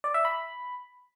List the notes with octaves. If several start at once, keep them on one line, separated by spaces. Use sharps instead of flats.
D5
E5
B5